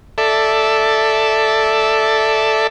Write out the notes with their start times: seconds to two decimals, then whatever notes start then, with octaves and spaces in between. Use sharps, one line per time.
0.18 A4 D5 E5